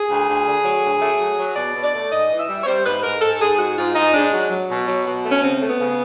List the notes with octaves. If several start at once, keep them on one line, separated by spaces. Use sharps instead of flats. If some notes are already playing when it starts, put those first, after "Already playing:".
Already playing: G#4
D2
D2
D3
F#3
D2
A3
F#3
F#3
B2 D5
B2
D5
A3
G#2 D#5
E3
E5
G3
C#5
G3 C5
G#2 B4
G#2 A#4
G#2 A4
G#2 G#4
G#3 F#4
G#2 F4
G#2 D#4
G#3 D4
F#3
F#3
B2
F#3
B2
A3
C#4
C#3 C4
A3
B3
C#3